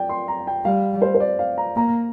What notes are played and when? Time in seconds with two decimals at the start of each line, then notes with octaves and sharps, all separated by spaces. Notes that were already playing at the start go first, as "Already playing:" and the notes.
Already playing: D5 G5
0.09 C6
0.28 A#5
0.47 G5
0.65 G3 F5
1.02 C5
1.15 C5
1.20 D5
1.39 F5
1.58 A#5
1.76 A#3 A#5